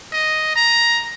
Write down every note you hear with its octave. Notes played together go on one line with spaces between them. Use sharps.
D#5
A#5